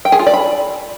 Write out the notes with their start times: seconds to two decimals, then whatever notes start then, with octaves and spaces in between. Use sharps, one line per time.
0.05 G5
0.12 G#4
0.19 F4
0.26 D5
0.34 B5